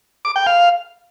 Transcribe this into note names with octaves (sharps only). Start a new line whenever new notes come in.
D6
G5
F5